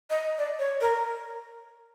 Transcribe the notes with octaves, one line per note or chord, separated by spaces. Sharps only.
D#5
D5
C#5
A#4